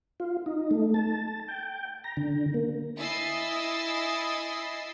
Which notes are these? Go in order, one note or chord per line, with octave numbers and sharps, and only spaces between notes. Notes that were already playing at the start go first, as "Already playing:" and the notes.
F4
D#4
A3
A5
G5
A#5
D3
A#3
E4 D#5 G#5 E6 A6 C7